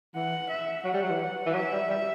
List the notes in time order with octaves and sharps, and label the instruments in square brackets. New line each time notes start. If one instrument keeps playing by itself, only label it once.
[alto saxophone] E3 [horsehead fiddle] F#5
[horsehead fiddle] E5
[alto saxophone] F#3 [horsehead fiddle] F#5
[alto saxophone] G3
F#3
E3
E3
[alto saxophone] F#3 [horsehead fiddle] E5
[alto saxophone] G3
G3